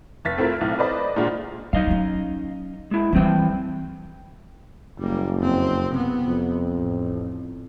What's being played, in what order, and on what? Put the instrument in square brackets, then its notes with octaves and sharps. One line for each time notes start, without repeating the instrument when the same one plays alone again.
[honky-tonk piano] F1 A6 B6
A3 C4 E4 F4 A#4
B1 A2
A4 B4 C5 D5 D#5 B5
A#2 G#3 D4 F4 F#4
[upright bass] F#3 [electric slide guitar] D#4 D#5 F5
[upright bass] F#3 C#4
[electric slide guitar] G#3 E4
[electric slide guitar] E3 C4 G5 [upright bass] F3 G3
[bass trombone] F#1 [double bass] G3 A#3
[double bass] F2 C4
C3 B3
[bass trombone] F2
[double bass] A1